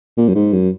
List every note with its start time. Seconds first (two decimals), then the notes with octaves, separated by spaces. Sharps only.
0.17 A#2
0.28 F#2
0.35 G#2
0.53 F#2